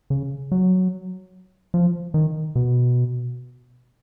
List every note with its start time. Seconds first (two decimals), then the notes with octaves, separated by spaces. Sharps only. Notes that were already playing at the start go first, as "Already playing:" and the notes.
0.10 C#3
0.52 F#3
1.74 F3
2.14 D#3
2.55 B2